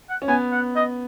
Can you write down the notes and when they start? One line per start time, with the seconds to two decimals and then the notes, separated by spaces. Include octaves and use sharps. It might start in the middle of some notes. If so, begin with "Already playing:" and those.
0.10 F#5
0.22 C#4
0.28 B3 G#5
0.52 F#5
0.76 D#5